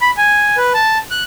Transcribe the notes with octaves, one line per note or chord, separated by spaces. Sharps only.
B5
G#5
B4
A5
F#6